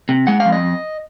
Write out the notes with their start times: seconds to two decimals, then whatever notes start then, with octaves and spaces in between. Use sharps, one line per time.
0.09 C3
0.27 G#3 F#5
0.40 F5
0.45 F2
0.52 D#5